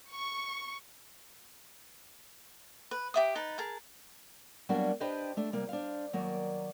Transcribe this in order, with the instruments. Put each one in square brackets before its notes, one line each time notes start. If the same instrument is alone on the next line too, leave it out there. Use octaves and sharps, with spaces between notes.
[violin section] C#6
[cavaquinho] B4
G4 E5 D#6
D#4 B4 A5
G#4 A#4 A5
[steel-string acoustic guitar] F#3 G3 A#3 B3 D4 F#4
D4 G4 B4 C5 D#5
A3 D4
C3 G3 A#3
D4 C5 F5
D#2 F#3 A#3 D5